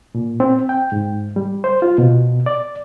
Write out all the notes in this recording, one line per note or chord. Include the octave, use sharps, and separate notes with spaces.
A#2
C4
G5
G#2
G3
C5
F4
B2
D5